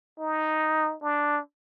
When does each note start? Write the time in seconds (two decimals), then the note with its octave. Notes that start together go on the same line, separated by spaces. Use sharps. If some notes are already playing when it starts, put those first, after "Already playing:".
0.20 D#4
1.02 D4